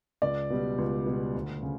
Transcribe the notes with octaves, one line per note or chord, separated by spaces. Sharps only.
C#2 D5
B2 G3
C#2
B2 G3
D2
C#3